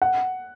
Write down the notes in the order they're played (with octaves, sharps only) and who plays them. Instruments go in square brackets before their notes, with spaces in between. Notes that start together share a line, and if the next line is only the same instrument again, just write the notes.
[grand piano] F#5